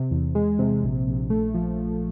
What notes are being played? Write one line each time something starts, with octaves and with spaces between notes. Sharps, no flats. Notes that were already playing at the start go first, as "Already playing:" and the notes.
Already playing: C3
E2
G#3
C3
A#1
A#1
A3
F3